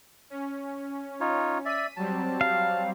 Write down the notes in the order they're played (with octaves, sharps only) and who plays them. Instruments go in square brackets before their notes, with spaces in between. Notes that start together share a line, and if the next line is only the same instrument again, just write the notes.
[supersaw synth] C#4
[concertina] D#4 F4 C#5
[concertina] D5 E5 [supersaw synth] B6 D#7
[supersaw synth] F#3 G3 C4 [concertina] A5
[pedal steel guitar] F5